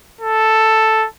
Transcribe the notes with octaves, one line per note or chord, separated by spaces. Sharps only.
A4